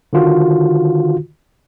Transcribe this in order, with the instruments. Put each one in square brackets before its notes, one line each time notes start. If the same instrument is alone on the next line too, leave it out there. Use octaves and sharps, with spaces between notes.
[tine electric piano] D3 D#3 F4 F#4